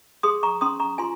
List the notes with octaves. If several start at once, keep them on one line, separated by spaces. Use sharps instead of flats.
G#4 C6 D#6
A#5 C#6
C#4 C6 D#6
A#5 C#6
F4 G#5 C6